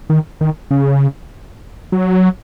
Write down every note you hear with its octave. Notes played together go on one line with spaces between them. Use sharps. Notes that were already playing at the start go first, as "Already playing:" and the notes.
D#3
D#3
C#3
F#3